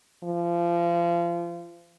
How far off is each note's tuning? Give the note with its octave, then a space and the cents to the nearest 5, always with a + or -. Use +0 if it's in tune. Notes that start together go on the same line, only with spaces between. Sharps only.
F3 -30